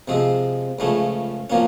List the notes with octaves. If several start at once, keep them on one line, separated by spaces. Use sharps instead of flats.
C3 F3 G#3 C4
C#2 C#3 F3 A3 C#4
A#2 F3 A#3 C#4